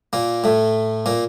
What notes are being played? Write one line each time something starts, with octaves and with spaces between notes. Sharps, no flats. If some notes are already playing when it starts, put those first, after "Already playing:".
A#2 A#3
A2 A3
A#2 A#3